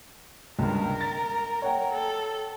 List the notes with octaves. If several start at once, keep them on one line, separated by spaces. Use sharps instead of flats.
C#2 G2 A#4
A6
C#5 F#5 G5
A4